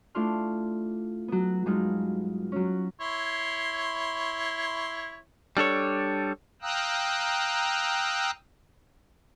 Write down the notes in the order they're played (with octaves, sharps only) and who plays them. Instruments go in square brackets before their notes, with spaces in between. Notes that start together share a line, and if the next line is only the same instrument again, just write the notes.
[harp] A3 D4 E4 F4 C6 F6
F#3 B3
G2 F#3 G#3 D#4 F4
F#3 C#4
[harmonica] E4 C#5 C6
[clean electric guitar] G3 D4 A4 C#5
[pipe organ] F5 G5 A#5 D#6 E6 F#6